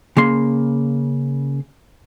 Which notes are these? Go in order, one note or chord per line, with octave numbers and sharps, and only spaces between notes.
C#3 A#3 C6